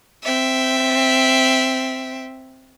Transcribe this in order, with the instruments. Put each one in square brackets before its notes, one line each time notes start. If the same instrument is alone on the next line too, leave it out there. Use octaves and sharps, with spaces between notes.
[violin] C4 E5